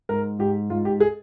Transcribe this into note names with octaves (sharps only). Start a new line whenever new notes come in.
G#2 A#4
G#2 G4
G#2 F4
G4
G#4